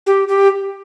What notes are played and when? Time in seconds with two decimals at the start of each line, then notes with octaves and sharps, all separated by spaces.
0.06 G4
0.28 G4